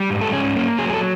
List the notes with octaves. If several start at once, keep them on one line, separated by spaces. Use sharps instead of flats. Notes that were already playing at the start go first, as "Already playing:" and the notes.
Already playing: G3
G#2
A4
C#4 G#4
A#3
F#3 G#4
G#4
A4